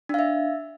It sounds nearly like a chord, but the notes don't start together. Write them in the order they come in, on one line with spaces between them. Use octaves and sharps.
D4 F5 E5